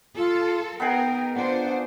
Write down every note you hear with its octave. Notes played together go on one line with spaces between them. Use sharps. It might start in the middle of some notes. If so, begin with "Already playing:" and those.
F4 A4
B3 D#4 G#4 A#4 G5
D4 F4 C5 F#5